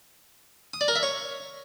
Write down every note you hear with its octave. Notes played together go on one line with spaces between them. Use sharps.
D#6
D5
A#4
E5
C#5